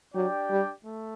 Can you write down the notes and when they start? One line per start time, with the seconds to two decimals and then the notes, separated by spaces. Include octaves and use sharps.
0.15 F#3 D4 G4 D5 G5
0.50 G3
0.85 A3